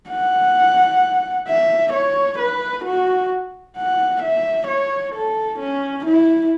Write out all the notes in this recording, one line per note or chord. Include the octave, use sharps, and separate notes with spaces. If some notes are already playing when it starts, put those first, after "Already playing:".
F#5
E5
C#5
B4
F#4
F#5
E5
C#5
A4
C#4
E4